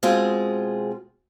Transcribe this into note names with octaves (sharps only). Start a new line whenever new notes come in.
B2 G#3 C4 F4 G#4